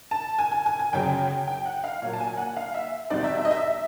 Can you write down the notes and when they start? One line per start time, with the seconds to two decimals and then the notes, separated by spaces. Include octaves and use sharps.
0.11 A5
0.39 G#5
0.52 G#5
0.66 G#5
0.79 G#5
0.93 F#2 C#3 F#3 G5
1.47 G5
1.66 F#5
1.84 F5
2.02 A#2 F#3 A#3
2.13 A5
2.20 G#5
2.37 F#5
2.57 F5
2.74 E5
3.10 E2 B2 G3 C4 D#4 D5
3.24 E5
3.38 E5
3.45 D#5
3.51 E5